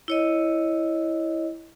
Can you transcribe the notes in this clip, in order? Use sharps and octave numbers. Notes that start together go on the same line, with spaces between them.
E4 C#5 D#5